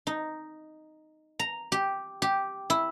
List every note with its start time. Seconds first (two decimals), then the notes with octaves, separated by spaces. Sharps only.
0.07 D#4
1.39 A#5
1.72 G4
2.22 G4
2.70 E4